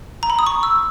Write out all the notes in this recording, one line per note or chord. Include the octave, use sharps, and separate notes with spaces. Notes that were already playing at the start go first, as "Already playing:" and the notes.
A#5
B5
D#6
C#6
E6